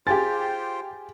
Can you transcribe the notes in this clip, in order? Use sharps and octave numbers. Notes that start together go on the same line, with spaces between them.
F4 G4 G#4 C5 G5 G#5 A6